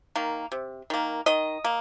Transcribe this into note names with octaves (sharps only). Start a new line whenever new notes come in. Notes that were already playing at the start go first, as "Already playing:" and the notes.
D#3 A#3
C3
D#3 A#3
D#3 D#5
A#3